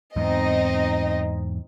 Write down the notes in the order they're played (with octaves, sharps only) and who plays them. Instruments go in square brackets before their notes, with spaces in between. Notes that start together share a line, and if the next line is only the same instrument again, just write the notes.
[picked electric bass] E2 G#2 [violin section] C4 D#4 D#5